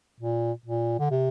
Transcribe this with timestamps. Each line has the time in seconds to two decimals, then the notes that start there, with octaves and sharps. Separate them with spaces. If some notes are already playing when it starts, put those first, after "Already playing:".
0.20 A#2
0.66 A#2
1.00 D3
1.11 C3